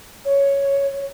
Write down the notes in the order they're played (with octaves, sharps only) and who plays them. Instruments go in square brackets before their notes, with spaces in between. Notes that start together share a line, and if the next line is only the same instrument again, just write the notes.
[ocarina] C#5